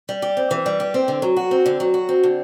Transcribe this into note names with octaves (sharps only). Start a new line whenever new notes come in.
G3
G4
C4
E3
G3
G4
C4
D3
F#3
F#4
C4
D3
F#3
F#4
C4
D3